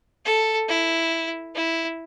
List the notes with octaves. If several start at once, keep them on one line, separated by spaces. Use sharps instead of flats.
A4
E4
E4